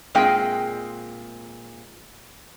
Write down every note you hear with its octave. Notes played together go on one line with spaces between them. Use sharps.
A#2 G#3 C4 G#4 D#5 G5